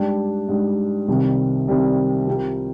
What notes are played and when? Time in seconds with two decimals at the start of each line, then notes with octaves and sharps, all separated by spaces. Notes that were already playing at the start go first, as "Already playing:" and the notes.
Already playing: G#2 G3 D4 G4
0.48 G#2 G3 D4 G4
1.08 C2 C3 D#3 G3 C4
1.67 C2 C3 D#3 G3 C4
2.27 F3 C4 G4 A#4